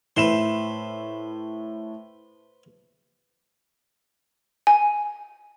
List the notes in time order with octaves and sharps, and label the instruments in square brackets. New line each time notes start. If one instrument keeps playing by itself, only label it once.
[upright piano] A2 E5 E7 [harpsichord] B4 C5
[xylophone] G#5